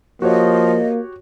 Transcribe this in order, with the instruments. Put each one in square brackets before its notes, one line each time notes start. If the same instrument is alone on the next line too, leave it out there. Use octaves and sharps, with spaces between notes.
[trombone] F3 [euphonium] A#3 [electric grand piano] F#4 G4 C#5 [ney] D#5